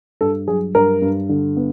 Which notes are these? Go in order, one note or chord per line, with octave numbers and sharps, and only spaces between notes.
G2 A4
F#3 G#4
G2 A#4
G2
D3
B3